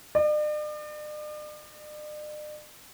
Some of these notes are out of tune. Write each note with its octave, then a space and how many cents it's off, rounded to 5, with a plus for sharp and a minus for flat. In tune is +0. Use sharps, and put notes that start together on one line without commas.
D5 +45